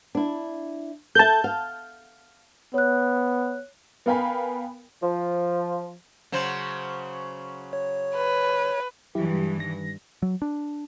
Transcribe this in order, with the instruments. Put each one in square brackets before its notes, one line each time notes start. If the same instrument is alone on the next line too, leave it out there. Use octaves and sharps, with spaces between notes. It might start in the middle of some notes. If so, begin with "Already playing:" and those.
[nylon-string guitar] D4 E4
[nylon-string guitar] A4 E5 [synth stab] A5 G6
[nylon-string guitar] F5
[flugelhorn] B3 [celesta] C#5 F#6
[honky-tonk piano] B3 A#4 F5 G5 G#5 B5
[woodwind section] F3
[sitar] C#3 F#3 C5
[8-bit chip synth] C#5
[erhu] B4
[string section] G2 E3 [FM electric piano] F#3 E4 G4
[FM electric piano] D#3 G3 A#6
[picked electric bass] F#3
D4